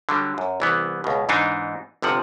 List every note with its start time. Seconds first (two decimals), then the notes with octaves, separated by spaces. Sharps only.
0.09 D3 F#3 G3
0.38 F#2
0.60 C2 E3 B3
1.04 C#2 B2
1.29 G#2 E3 D4 D#4
2.02 G1 C3 F3 F#5